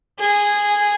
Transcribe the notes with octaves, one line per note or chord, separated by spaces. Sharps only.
G#4